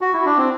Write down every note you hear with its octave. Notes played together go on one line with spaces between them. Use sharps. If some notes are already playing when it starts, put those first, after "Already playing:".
F#4
E4
D4
C4